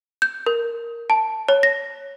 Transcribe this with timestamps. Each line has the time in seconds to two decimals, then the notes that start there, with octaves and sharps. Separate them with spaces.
0.22 G6
0.46 A#4
1.10 A5
1.49 C#5
1.63 A#6